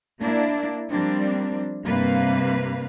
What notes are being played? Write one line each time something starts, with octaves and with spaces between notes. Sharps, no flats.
A#3 D4 E4
F3 G3 A#3 C4 D4
G2 C3 A#3 B4 F5